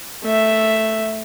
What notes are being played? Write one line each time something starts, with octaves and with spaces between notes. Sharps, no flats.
A3 E5